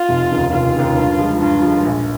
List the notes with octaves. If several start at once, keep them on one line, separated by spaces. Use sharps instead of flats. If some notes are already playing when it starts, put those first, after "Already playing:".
Already playing: F4
F1
D#2 C#3
F1 F4
D#2 C#3
G2
F3 G#3
G2 F4
F3 G#3
A#1